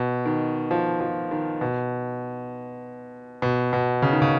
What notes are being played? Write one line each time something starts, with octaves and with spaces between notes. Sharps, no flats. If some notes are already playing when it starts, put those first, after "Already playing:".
Already playing: B2
D#3
F3
F3
D#3
B2
B2
B2
C#3
D#3
C#3